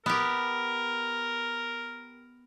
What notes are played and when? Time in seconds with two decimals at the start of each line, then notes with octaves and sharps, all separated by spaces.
0.06 B3 G4 A#4